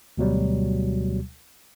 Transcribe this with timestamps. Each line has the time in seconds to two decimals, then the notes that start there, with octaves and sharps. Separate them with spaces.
0.18 D2 B2 F#3 G3